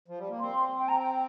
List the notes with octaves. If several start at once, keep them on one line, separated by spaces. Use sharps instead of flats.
F3
G3
A#3
C4 C6
G5
A#5
G5